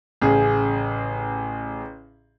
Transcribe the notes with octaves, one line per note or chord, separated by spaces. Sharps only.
A1 C#3 G#4